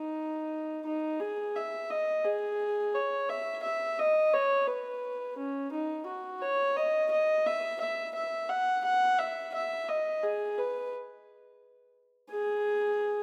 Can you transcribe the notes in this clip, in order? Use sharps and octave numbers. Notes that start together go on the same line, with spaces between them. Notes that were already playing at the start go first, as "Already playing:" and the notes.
Already playing: D#4
D#4
G#4
E5
D#5
G#4
C#5
E5
E5
D#5
C#5
B4
C#4
D#4
F#4
C#5
D#5
D#5
E5
E5
E5
F#5
F#5
E5
E5
D#5
G#4
B4
G#4